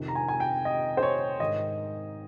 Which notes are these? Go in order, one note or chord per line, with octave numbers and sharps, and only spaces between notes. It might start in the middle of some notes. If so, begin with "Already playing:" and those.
Already playing: F2 C3 D#3
A#5
G#5
G#5
G5
D#5
C5
C#5
G#2 D#3 D#5